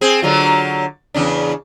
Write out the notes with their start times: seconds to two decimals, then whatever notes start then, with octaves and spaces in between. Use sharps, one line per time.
0.01 C4 G#4
0.22 D3 F#3 F4
1.14 E2 C#3 D4